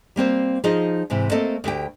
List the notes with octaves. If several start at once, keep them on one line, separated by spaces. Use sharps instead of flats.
G3 A#3 C4 C5
F3 D#4 F4 G#4 D#5
G#2 C3 E3
A3 A#3 C4 A4 D#5
D2 G4 G5